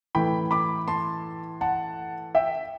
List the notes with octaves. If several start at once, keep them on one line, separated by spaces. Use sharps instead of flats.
A2 E3 G5 B5
B5 D6
A5 C6
F#5 A5
E5 G5